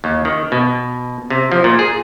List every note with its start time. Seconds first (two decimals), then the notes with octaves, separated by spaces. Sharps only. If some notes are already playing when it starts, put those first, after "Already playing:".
0.04 D#2
0.25 D#3
0.52 B2
1.30 C3
1.52 F3
1.64 A#2
1.79 G#4